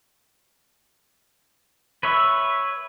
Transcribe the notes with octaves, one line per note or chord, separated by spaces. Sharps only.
B4 C#5 E5